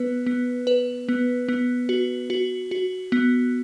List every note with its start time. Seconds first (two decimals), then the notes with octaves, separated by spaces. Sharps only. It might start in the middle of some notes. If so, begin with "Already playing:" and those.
Already playing: B3 B4
0.26 B3
0.67 B4
1.09 B3
1.48 B3
1.89 F#4
2.30 F#4
2.71 F#4
3.12 B3